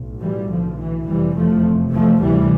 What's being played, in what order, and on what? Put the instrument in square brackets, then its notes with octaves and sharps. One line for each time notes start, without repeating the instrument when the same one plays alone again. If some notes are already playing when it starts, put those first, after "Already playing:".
Already playing: [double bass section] B1 A2
E3 G3
D3 F3
E3
F1 E2 C3 E3 G3
F3 A3
F3 A3
D2 C3 E3 G3